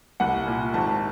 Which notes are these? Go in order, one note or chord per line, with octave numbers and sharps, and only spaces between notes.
C2 F#5
A#2
G#1 A5